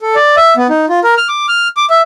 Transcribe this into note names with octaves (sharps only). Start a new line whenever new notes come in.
A4
D5
E5
B3
D#4
F4
A#4
F6
D6
F6
D6
E5